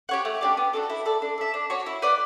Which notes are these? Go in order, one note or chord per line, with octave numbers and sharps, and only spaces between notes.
G4 C#5 F#5
A3
D4 G4 D5
B3
D4 F#4 A4
E4
A4 D5
D4
A4 E5
D4
F#4 C#5
E4
B4 D5 F#5